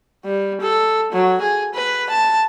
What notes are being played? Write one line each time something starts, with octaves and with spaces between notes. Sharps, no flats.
G3
A4
F#3
G#4
B4
A5